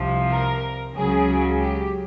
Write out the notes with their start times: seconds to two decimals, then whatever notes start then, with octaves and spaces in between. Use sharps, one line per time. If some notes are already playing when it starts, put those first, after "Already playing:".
Already playing: C2 C3 F3
0.30 A#4
0.95 C#2 C#3 F#3 G#4
1.61 G4